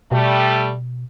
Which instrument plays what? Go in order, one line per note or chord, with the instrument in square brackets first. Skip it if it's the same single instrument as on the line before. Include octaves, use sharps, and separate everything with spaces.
[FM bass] B2 [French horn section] G3 A3